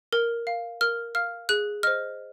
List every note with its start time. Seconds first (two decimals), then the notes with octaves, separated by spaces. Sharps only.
0.13 A#4
0.47 F5
0.81 A#4 F6
1.15 F5 F6
1.49 G#4 F#6
1.83 C5 D#5 F6